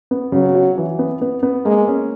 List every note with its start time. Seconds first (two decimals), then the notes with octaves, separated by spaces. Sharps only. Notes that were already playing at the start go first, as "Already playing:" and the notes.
0.11 B3
0.32 C#3 F#3
0.55 F#4
0.78 E3
0.99 B3
1.22 B3
1.43 B3
1.65 G#3 A#3
1.88 C#4